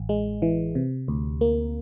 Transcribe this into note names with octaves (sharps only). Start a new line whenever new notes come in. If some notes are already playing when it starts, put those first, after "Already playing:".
Already playing: A1
G#3
E3
C3
D2
A#3